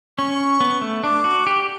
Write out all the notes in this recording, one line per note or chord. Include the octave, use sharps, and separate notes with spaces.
C#4 C#6
B3
A3
D4 D6
F#4
G4